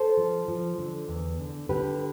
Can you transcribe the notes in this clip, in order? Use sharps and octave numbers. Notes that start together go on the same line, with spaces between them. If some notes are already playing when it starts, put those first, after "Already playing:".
Already playing: A4 C5
F3
F3
D3
E2
D3
D3 G4 B4